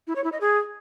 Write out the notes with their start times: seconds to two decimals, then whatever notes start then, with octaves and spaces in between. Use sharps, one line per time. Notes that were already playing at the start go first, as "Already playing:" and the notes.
0.07 E4
0.16 C#5
0.24 E4
0.32 D#5
0.41 G#4